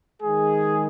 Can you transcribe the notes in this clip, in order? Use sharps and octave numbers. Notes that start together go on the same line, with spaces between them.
D#3 G#3 G#4